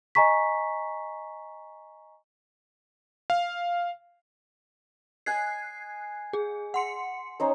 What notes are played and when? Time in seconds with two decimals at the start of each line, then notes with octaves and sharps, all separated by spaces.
0.15 D#5 G#5 A#5 C#6 B6
3.30 F5
5.26 D#5 G#5 F#6 G#6 C7
6.33 G#4
6.74 F#5 C6 C#7
7.40 C#4 D#4 C5